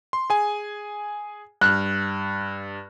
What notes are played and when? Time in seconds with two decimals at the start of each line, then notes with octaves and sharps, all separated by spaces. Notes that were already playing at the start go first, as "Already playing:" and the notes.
0.13 C6
0.30 G#4 G#5
1.61 G2 F6 F#6